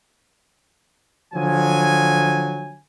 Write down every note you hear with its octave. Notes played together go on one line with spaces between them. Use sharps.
D3 F3 F#3 G#5